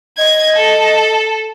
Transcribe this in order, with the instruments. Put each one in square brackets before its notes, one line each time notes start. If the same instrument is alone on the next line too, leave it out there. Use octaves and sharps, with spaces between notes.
[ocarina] D#5 [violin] G#6
[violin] A4